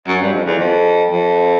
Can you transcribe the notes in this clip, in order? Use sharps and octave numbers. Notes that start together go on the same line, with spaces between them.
F#2
G2
F2
E2
F2
F2